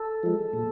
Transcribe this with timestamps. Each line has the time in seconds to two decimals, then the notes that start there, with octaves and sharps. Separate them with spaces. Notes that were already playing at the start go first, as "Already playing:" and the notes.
Already playing: A4
0.23 F3 G#3
0.53 A#2